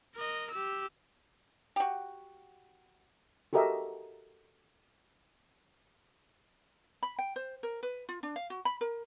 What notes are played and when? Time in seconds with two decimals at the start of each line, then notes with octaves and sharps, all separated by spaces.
0.16 A#4 D#5
0.50 G4 E6
1.76 F#4 G4
3.53 F#4 G4 A4 A#4 D#5 E5
7.03 B5
7.19 G5
7.36 C5
7.63 A#4
7.83 B4
8.09 F4
8.23 D4
8.36 F5
8.50 F#4
8.65 B5
8.81 A#4